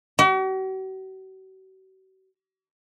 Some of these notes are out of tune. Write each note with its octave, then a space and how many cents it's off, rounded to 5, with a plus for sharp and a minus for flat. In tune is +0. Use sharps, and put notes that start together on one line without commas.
F#4 +45